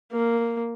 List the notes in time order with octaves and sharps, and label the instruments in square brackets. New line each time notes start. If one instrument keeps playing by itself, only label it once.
[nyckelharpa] A#3